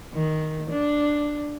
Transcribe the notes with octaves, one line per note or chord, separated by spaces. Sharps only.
D#3
D4